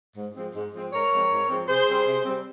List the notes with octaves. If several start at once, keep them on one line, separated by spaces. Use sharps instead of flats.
G#2
F3 G#3 C4
G#2
F3 G#3 C4
G#2 A#4 C#5
F3 G#3 C4
G#2
F3 G#3 C4
C3 G#4 C5
G3 C4
C3
G3 C4